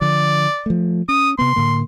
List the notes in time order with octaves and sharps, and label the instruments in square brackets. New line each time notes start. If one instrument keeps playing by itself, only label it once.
[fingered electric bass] D3 F3 [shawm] D5
[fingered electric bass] F3 A3
[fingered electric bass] C#4 [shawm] D#6
[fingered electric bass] C3 B3 [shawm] C6
[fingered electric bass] A2 D3 A#3